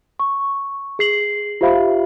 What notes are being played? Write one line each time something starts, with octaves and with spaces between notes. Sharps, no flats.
C#6
G#4 C7 F#7
F4 G4 C5 E5 F5 B5